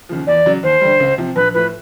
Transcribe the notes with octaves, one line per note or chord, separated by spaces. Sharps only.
D#2 C#3 F3
E2 D5
C#3 F#3
D#2 C5
D3 G3
C#2
C3 F3
A#1 B4
A2 F3 B4